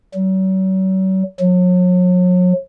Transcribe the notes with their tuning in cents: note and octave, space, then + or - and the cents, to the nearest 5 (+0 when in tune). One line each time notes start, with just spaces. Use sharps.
F#3 +40
F#3 -40